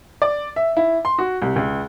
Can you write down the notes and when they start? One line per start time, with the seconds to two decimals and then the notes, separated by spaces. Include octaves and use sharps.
0.22 D5
0.56 E5
0.77 E4
1.05 C6
1.18 F#4
1.42 C2
1.56 C#2